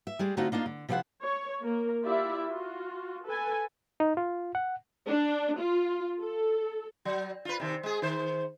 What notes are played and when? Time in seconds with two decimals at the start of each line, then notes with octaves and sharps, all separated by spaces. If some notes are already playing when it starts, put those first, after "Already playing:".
0.07 E5
0.19 G3 G#3 G#4
0.37 D3 A3 C4 D#4 F4 F#4
0.52 A#3 D4 D#4 F4
0.66 D3
0.89 C3 F3 E4 D5 F5 F#5
1.23 C#5
1.61 A#3 A#4
2.03 E4 F4 G4 D5 E5
2.46 F4 F#4
3.25 A4 B4 G#5
4.00 D#4
4.17 F4
4.55 F#5
5.07 D4
5.60 F4
6.20 A4
7.05 F#3
7.45 F4 B4
7.60 C3 D#3
7.83 G#3 G#4
8.02 D#3 C5